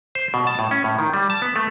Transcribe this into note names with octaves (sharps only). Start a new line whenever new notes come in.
C5
B2
A5
A2
C#4
A2
D#3
G3
A5
B3
A3